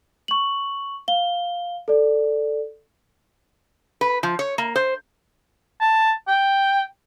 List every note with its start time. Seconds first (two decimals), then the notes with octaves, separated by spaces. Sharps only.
0.28 C#6 F#7
1.08 F5 G7
1.88 A4 D5
4.01 B4
4.23 F3
4.39 C#5
4.58 A#3
4.76 C5
5.80 A5
6.28 G5